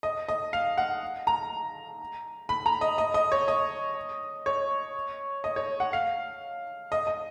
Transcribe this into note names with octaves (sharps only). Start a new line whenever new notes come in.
D#5
D#5
F5
F#5
A#5
B5
A#5
D#5
D#5
D#5
C#5
D#5
C#5
D#5
C#5
F#5
F5
D#5
D#5